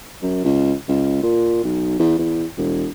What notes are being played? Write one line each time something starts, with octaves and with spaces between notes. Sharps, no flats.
F#2
C#2
C#2
A#2
B1
E2
E2
E1